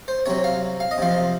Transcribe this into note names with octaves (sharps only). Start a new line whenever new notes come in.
C5
C3 F#3 C#5
F5
F5
D#5
C3 F3 F5